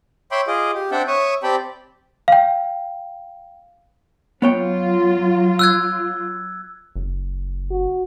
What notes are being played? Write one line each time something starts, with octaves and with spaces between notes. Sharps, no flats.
C#5 E5 G5 B5 C6 D6
F4 G#4 D#5 D6
G4
C4 D4 D5 E5 F#5 G5
C#5 E5 C#6 D#6
C4 G4 D5 G5 A5 B5
F5 G5
F#3 B3 F4 C#5 G5
E6 F#6 G#6
F#1
F#4